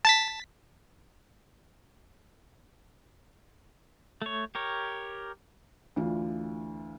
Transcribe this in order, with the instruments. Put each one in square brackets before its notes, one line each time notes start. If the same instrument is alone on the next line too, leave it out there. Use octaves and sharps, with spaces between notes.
[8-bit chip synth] A5 A6 B6
[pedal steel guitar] A3 C#5
G4 A#4 C#5
[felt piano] D2 E3 D4 F4